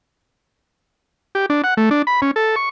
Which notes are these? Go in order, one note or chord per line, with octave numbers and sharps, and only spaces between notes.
G4
D4
F#5
A3
D4
B5
C#4
A4
C#6